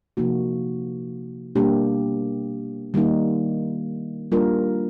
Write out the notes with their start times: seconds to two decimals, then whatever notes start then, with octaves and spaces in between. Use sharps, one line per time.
0.17 C3 F3 A#3 D#4 F#4
1.55 B2 G3 A#3 D4 G4
2.94 D#3 G3 A#3 D#4
4.32 G3 A#3 D4 F4 A#4